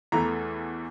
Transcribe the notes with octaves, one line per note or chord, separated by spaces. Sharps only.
E2 E3 A3 A#5